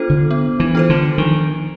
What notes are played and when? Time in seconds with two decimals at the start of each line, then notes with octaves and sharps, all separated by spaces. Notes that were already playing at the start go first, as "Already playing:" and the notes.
Already playing: B3 D4 F4 A4 C5
0.10 D3
0.31 B3
0.60 E3
0.75 D4 F4 A4 C5
0.89 D3
1.18 D#3 F3